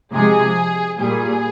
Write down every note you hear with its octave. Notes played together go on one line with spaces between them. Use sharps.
C3 F3 G#3 G#4
A#2 G3 G#4